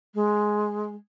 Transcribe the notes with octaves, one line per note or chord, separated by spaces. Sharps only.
G#3